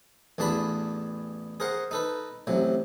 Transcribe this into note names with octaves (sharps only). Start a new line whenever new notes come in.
A1 E2 D4 G#4 A5 B5
G#4 A#4 C5 F#5
D#4 A4 B4
A1 C3 F#3